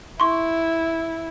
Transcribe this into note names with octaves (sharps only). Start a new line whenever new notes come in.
E4 C6 C#6